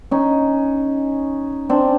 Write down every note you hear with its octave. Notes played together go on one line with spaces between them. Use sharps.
C#4 D#4
C4 D4